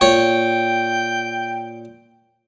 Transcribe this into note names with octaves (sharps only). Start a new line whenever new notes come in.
A#2 C#5 G5